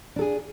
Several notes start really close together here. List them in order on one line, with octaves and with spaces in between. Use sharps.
D4 A4 G#4